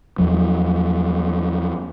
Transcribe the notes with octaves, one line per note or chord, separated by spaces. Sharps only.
E2 F3 F#3